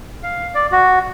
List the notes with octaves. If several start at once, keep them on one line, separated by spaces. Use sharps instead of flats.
F5
D5
F#4